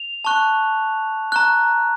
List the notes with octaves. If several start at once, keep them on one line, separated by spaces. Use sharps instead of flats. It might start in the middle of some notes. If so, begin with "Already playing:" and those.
Already playing: F7
A5 C#6 F#6
A#5 C#6 F#6